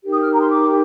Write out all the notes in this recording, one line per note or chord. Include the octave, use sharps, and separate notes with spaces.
D#4 G4 A#4
D#6
F6
A#5
C6
D6